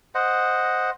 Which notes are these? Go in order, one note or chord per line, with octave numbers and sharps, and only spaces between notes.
C5 D#5 F#5